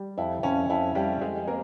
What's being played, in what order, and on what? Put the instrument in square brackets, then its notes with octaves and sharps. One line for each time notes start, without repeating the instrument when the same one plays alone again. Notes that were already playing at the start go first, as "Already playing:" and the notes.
Already playing: [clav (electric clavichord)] G3
[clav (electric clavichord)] F2 [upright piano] E4
[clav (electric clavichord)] F2 [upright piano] C#4
[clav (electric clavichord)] F2 [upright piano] E4
[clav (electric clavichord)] F2 [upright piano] G3 G4
[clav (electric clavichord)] F2 [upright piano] G#3 G#4
[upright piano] A#3 A#4 [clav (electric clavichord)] C4